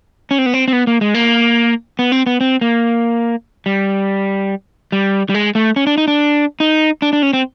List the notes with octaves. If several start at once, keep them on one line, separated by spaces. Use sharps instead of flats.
C#4
C4
B3
C4
C4
B3
A#3
G#3
A#3
B3
C4
B3
C4
A#3
G3
G3
G3
G#3
A3
C#4
D4
D#4
D4
D#4
D4
D4
C#4
C4